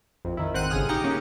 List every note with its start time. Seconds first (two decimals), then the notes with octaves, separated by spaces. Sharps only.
0.25 A#1 F2
0.37 D#3 E4
0.54 G#1 C4 C5 F#5 F#6 D#7
0.70 G1 A#2 C#3 G#4 D#6 F6
0.89 D#4 G4 A#5 C#7
1.04 A#3 C#4